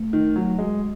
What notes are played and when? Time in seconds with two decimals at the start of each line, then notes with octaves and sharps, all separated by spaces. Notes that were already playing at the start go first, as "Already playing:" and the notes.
Already playing: A3
0.13 D#3
0.36 F#3 F#4
0.58 G#3